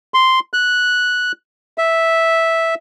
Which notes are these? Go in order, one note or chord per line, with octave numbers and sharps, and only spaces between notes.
C6
F#6
E5